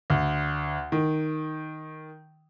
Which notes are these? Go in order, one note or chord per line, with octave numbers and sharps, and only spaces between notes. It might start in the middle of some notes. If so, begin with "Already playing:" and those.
D2
D#3